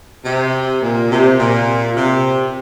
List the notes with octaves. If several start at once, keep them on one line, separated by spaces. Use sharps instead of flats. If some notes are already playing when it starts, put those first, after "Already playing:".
C3
A#2
C3
A#2
C3